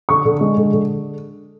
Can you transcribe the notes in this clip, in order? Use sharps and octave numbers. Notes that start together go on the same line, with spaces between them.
D3 C#6
D3
G#3
D3
D3